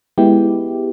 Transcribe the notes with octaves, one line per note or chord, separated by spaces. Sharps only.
G#3 B3 E4 G4